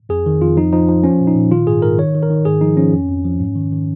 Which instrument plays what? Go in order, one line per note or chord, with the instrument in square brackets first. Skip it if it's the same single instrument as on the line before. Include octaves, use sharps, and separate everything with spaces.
[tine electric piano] F2 G#4
D#3
F2 F4
F3 D#4
F3 D#4
F3 D#4
F3 C#4
A#2
D#4
A#2
D#3 F4
G#2 G#4
G#2 A#4
D#3 C#5
D#3
A#4
D#3
G#2 G#4
F3 D#4
F3 C#4
F2
F2
F3
G#2
D#3
D#3